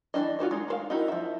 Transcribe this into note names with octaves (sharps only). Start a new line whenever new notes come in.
E3 C4 D4 D#5
F4 F#4 C5 D#5
G#3 D#4
G#3 C5 F5
D#4 E4 F#4 A#4 D#5
F3 E5